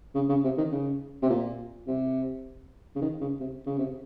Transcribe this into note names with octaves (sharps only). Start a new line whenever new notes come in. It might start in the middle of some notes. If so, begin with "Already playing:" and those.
C#3
C#3
C3
D#3
C#3
C3
A#2
C3
C#3
D#3
C#3
C3
C#3
C3